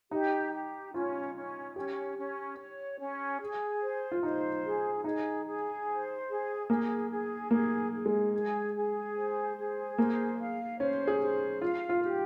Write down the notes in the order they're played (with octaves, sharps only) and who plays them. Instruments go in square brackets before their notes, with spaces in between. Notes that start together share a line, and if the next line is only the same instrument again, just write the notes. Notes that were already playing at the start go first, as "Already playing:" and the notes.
[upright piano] D#4 [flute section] G4
[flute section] G4
[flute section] C#4 [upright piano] F4
[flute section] C#4
[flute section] C#4 [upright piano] G4
[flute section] C#4
C#5
C#4
G#4
C5
[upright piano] F4
[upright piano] D#4 [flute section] C5
[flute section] G#4
[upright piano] D#4 [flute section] G#4
[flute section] G#4
C5
G#4
[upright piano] A#3 [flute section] G#4
[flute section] G#4
[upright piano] A#3 [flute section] G#4
[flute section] G#4
[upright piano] G#3
[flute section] G#4
G#4
C5
G#4
[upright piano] A#3 [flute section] C5
[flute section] F5
[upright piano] C#4 [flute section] C5
[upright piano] G#4
[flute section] C5
[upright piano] F4 [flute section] F5
[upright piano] F4
[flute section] G4